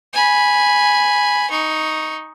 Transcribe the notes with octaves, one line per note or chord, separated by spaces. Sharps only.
G#5 B5
D#4 C#6